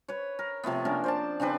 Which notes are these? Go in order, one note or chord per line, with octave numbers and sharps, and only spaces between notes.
B4 C#5
A#4
C3 F3 A3 B3
A#3 C#4 D4 A#4
C5 D5 A5
C#3 C4 D4 B4